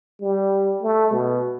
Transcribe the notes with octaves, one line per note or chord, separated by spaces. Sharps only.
G3
A3
B2